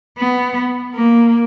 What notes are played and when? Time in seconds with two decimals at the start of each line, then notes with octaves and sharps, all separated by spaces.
0.18 B3
0.94 A#3